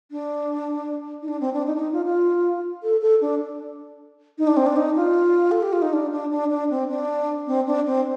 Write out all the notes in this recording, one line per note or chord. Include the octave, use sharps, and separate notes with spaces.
D4
D#4
D4
C4
D4
D#4
D4
D#4
F4
F4
A4
A4
D4
D#4
D4
C4
D4
D#4
F4
A4
G4
F4
D#4
D4
D4
D4
D4
C4
D4
C4
D4
C4